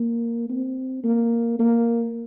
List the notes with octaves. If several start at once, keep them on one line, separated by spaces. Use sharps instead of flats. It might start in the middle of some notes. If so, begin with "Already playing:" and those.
Already playing: A#3
C4
A#3
A#3